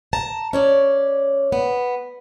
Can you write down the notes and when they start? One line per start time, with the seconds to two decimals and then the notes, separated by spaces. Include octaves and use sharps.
0.13 A5 A#5
0.53 C#4 C#5 D5
1.52 B3